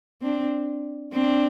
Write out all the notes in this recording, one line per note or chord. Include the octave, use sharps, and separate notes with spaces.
C4 D4
C4 D4